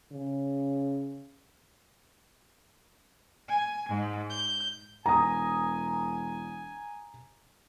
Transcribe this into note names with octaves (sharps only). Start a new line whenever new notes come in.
C#3
G#5
G#2
G6
E1 G#5 A#5 D#6